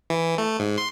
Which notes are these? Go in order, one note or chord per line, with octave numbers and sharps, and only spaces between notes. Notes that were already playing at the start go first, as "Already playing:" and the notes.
E3
A3
G#2
C6